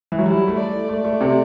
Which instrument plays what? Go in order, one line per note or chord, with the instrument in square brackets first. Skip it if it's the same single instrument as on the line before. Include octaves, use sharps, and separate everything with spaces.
[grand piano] E3
F#3
[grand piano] G3 [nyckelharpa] E4
[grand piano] A3
[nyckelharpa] D5
[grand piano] A3 [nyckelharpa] D5
[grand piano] A3
C3